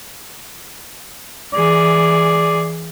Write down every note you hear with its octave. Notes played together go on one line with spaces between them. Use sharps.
E3 G#4 D5